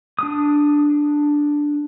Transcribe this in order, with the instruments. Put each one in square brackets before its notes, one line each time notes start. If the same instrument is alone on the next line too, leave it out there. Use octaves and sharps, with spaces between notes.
[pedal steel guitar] D4 D#6